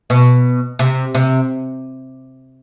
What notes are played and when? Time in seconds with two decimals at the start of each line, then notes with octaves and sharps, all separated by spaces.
0.10 B2
0.79 C3
1.15 C3